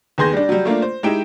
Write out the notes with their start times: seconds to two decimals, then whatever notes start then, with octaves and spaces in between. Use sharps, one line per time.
0.18 D#2 B3 G#4 C6 G6 A#6
0.33 G3 D4
0.49 F#3 G3
0.65 A3 A#3 D4 F4
0.82 C5
1.03 G#3 D#4 E4 G4 G5 E7